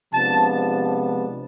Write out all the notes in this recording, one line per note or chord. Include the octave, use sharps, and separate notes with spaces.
C3 F3 G#3 B3 D4 A5